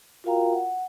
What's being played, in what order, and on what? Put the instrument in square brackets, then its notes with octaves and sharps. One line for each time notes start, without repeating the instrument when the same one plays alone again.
[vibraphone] F4 F#4 A#4 F5 G5 A#5
F#5